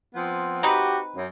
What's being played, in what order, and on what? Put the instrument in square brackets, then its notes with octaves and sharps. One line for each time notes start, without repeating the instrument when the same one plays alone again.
[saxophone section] F3 B3 C4
[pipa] C4 D#4 B4 [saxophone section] F#4 G4
[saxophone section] F#2